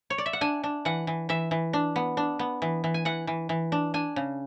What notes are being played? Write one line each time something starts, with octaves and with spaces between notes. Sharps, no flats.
C#5
D5
E5
F#5
D4 G#5
D4
E3 F#5
E3
E3 E5
E3
D4
B3
D4
B3
E3
E3
G#5
E3 F#5
E3
E3
D4
D4 G#5
C#3